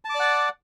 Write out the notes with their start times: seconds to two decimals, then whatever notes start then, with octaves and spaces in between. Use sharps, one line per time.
0.05 A5
0.10 D6
0.15 D5
0.20 F#5